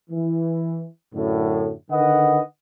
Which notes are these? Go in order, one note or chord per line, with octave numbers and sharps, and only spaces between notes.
E3
F#2 A2 D3
D3 D#3 B4 D#5 F#5